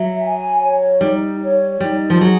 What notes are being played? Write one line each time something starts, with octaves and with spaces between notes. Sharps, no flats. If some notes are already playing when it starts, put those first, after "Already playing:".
Already playing: F#3 E5
G#5
C#5
G3 D#4
C#5
G3 D#4
F3
F#3 G#4